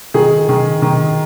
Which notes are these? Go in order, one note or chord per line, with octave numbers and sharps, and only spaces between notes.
D#3 G#4
D#3
D#3